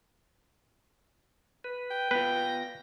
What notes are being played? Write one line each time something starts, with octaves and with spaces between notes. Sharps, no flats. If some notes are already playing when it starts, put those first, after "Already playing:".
B4
G5
B3 F4 B4 A#6